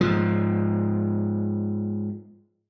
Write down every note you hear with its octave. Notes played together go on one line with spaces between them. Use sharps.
G#2 F3